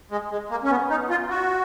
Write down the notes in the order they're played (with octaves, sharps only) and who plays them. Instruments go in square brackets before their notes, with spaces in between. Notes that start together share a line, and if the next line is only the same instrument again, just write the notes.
[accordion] G#3
G#3
A#3
C#4
B3
D#4
F4
F#4